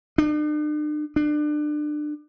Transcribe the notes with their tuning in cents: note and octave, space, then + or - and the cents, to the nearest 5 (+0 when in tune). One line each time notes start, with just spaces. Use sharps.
D4 +45
D4 +30